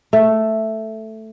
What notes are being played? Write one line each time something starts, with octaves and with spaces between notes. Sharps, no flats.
A3